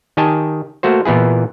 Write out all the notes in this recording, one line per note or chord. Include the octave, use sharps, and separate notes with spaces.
D#3 G4 D#5 G#5 A5
A3 A#3 F#4 C5
A#2 E3 B3 E4 G#4